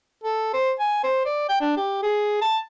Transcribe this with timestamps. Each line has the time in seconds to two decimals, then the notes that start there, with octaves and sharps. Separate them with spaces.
0.24 A4
0.53 C5
0.80 G#5
1.04 C5
1.25 D5
1.49 G5
1.61 D4
1.77 G4
2.03 G#4
2.42 A5